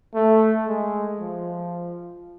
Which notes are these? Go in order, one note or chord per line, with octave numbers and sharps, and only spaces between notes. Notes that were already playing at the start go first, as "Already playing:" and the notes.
A3
G#3
F3